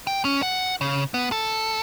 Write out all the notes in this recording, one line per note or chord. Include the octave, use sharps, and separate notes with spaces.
G5
C#4
F#5
C#3
B3
A4